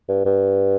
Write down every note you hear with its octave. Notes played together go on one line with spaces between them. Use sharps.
G2
G2